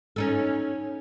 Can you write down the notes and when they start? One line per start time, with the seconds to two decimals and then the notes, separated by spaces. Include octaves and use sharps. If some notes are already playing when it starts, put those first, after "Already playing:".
0.16 C#4 D#4 A4